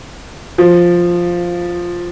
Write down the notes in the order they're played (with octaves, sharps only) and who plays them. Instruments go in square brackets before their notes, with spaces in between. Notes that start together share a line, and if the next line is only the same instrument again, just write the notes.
[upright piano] F3